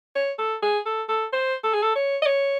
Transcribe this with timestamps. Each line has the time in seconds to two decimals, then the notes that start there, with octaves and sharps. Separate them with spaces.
0.15 C#5
0.39 A4
0.62 G#4
0.86 A4
1.09 A4
1.33 C5
1.64 A4
1.73 G#4
1.83 A4
1.95 C#5
2.22 D#5
2.26 C#5